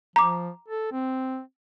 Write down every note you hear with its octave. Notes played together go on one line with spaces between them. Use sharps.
F3 A#5 D6
A4
C4